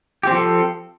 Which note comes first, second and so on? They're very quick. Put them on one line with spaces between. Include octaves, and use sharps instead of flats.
G4 C4 F3 A4